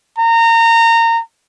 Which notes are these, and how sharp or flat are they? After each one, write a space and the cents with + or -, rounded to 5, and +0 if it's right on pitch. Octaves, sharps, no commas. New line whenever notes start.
A#5 -25